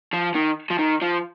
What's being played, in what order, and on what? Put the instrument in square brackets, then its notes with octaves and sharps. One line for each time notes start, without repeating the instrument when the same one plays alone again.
[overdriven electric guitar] F3
D#3
F3
D#3
F3